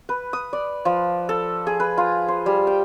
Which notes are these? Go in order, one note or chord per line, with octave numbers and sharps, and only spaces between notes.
B4
D#6
D5
F3
A4
G#4
B4
F4
C5
G3
G5